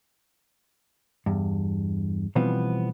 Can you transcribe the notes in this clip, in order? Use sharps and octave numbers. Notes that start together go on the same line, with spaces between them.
E2 G2
B2 E3 F3 G3 B3 C4